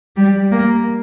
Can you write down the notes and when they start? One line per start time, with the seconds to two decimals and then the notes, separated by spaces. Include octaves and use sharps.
0.17 G3
0.51 A#3